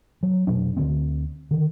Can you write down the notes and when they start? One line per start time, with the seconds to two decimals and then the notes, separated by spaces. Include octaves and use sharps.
0.23 F#3
0.47 F1 B2 F#3 D4
0.77 D2 D3 A3 C4
1.51 D3 D#3